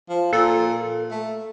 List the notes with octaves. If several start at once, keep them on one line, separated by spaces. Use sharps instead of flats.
F3
A#2 A4
A3